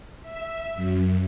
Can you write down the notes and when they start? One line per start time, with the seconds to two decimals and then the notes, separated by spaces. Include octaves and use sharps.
0.22 E5
0.75 F#2